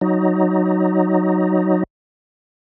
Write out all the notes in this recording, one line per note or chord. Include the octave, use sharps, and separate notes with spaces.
F#3 D#4